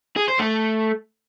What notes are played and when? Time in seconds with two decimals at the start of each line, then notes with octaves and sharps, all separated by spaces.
0.16 G#4
0.28 C5
0.39 A3